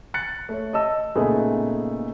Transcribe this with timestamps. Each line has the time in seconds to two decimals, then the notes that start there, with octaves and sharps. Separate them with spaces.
0.14 F#6 A6 C#7
0.49 A3 C#5
0.73 D#5 A5 E6
1.15 A#2 C#3 A3 B3 D#4 G#4